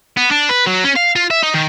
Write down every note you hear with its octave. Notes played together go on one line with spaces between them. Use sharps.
B3
D4
B4
F#3
C#4
F5
F4
E5
D#4
D#3